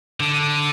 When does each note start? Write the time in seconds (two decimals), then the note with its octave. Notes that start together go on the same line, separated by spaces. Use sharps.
0.20 D3